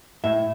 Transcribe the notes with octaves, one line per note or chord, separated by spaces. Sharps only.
A2 E5